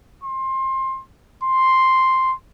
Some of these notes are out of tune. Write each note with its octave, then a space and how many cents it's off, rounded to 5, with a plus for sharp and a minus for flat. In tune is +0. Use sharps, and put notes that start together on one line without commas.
C6 +25
C6 +0